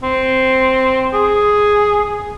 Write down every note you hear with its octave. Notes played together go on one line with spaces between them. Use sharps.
C4
G#4